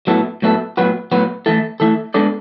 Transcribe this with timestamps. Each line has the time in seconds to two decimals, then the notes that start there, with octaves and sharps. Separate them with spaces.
0.07 A2 F#3 B3 E4 A4
0.42 A2 F#3 B3 E4 A4
0.77 A2 F#3 B3 F#4 B4
1.12 A2 F#3 B3 F#4 B4
1.46 E3 A3 E4 A4
1.80 E3 A3 E4 A4
2.14 G#3 B3 D4 A4 D5